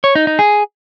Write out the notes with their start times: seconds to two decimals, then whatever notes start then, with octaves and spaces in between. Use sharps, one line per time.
0.04 C#5
0.15 D#4
0.27 D#4
0.39 G#4